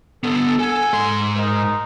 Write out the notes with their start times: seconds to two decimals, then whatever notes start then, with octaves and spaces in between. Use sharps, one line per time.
0.23 D3 B3 A4
0.59 A4 F#5 G#5
0.93 G#2 C6
1.36 D#4 A#4 C5